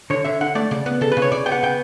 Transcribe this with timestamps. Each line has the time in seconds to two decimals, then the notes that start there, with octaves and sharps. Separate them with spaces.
0.10 D3 C#5
0.24 D3 E5
0.41 D3 F#5
0.55 A3 D5
0.71 C#3 D5
0.86 B3
1.01 C#3 A4
1.12 B4
1.17 C#3
1.22 C#5
1.32 C#3 D5
1.46 B3 G5
1.52 F#5
1.63 C#3 G5